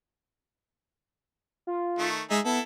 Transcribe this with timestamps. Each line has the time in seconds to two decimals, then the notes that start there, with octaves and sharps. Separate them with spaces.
1.67 F4
1.99 D#3 A3
2.31 G#3 D#4 G#4 E5
2.45 B3 E4 A4